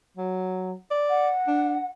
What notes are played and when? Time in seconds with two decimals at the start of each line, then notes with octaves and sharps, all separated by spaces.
0.17 F#3
0.91 D5
1.10 F#5
1.48 D4